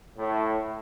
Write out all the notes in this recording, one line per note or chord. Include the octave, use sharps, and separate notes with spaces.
A2